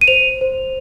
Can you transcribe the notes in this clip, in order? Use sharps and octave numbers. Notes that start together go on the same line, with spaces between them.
D#7
C5 F7
C5